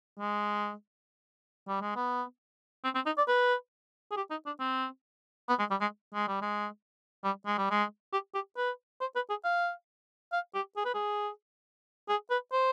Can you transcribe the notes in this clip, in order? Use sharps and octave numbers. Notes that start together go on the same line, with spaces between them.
G#3
G3
G#3
B3
C4
C4
D#4
D5
B4
G#4
G4
D#4
D4
C4
B3
G#3
G3
G#3
G#3
G3
G#3
G3
G#3
G3
G#3
G4
G4
B4
C5
B4
G#4
F5
F5
G4
G#4
B4
G#4
G#4
B4
C5